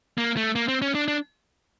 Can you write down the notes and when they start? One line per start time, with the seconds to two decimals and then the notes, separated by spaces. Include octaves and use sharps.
0.18 A#3
0.37 A3
0.55 A#3
0.68 C4
0.82 C#4
0.95 D4
1.08 D4